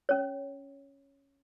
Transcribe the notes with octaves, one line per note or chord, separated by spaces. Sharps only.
C#4 C#5